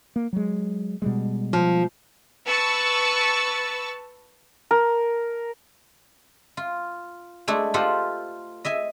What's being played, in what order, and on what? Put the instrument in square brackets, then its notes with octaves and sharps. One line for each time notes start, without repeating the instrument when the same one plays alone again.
[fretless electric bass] A#3
F#3 G#3
B2 G3 G#3
[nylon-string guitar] F3
[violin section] B4 A5 C#6 E6 A6
[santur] A#4
[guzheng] F4
G#3 A3 D4 E4
F4 G4 A4 C5 D#5 F#5
D#5 E5 G#5